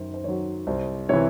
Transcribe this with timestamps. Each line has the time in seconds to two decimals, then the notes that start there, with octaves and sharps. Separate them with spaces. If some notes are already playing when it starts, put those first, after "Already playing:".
Already playing: F#2 D#3 C5
0.14 C5
0.24 D#3 F#3 C#5
0.67 C2 C5
1.09 C3 E3 C#5